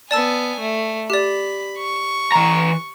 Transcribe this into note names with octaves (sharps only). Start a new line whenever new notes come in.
B3 D5 G#5 A5 E6
A3
G4 D5 B5
C#6
E3 A#5